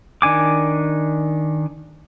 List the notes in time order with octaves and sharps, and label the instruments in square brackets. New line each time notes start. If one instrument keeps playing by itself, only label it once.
[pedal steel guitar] D#3 D4 G#5 D6